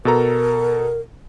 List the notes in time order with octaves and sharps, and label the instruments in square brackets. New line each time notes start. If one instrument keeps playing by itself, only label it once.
[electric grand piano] B2 A4 A#5 [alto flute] A#4